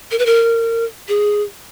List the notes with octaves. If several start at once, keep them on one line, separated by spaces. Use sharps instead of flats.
A#4
B4
A#4
G#4